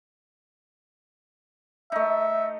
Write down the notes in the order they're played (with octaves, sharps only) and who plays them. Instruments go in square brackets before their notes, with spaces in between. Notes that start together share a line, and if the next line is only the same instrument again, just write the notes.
[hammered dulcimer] A3 D#4 [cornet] E5